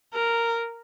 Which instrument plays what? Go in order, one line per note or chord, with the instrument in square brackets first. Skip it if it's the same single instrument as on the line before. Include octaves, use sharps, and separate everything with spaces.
[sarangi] A#4